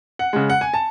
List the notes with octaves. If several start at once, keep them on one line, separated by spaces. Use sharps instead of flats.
F#5
C#3 G#3
F#5
G#5
A5